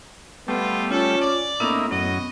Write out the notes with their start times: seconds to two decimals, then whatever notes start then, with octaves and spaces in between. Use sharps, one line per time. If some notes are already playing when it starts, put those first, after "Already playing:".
0.48 G3 A3 B3 F4
0.91 C#4 F4 A4
1.21 D5
1.60 A2 A#3 B3 C#4 D#4 E4
1.91 F#2 D#5